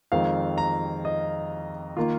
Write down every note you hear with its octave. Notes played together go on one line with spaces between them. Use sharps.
F2 D#3 G#3 C4 F5
A#5
D#5
D#3 A#3 F4